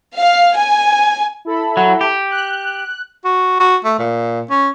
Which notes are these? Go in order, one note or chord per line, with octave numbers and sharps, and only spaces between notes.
F5
G#5
E4 A4 B5
F#3
G4
F#6
F#4
F#4
A3
A#2
C#4